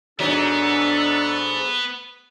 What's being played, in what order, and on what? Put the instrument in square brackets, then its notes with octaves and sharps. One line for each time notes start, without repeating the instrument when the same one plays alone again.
[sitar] G#2 F#3 [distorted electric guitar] B3 [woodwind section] D4 A4